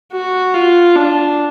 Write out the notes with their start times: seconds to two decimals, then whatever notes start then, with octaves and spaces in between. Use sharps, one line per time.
0.13 F#4
0.54 F4
0.96 D4